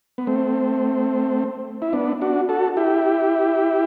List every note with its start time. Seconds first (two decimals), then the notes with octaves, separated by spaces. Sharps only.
0.18 B3
0.27 A3 C4
1.82 E4
1.93 B3 D4
2.21 D4 F#4
2.49 F#4 A4
2.77 E4 G4